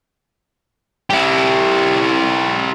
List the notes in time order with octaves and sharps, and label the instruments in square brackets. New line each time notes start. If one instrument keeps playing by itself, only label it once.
[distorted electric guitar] E4 G4